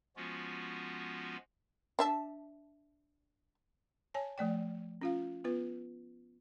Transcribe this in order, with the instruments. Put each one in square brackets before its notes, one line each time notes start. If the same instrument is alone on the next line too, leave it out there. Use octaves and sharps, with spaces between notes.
[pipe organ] F3 G#3 B3 C#4 F4 F#4
[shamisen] D4 E5 A5
[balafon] C#5 G#5 A5
F3 A3 D5 G5
C#4 F4 F5
B3 F4 B4